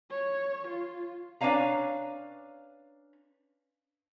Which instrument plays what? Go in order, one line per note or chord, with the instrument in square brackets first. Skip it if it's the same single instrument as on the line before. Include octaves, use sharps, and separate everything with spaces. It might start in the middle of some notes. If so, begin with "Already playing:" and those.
[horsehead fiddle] C#5
F4
[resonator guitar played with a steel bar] C#4 D4 B4 C#5 F5 A#5